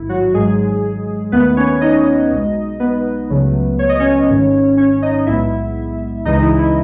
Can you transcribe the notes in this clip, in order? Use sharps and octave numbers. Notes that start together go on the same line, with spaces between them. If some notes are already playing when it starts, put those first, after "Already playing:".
Already playing: A1 G#2 D#3 E4
F#3 F#4
G#1 G#2 F#3 G#3 G#4
D#2 D#3 A3 B3 B4
C#4 C#5
D#4 D#5
B1 B2 G#3
B3 B4
C#2 C#3 F#3 A3
C#5
D#5
C#4 C#5
G#1 G#2 D#3
C#4 C#5
D#4 D#5
B1 A2 G#3 B3 E4 E5
C#2 C#3 E3 G#3 D#4 D#5
E4
E4